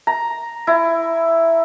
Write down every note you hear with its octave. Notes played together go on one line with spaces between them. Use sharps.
A#5
E4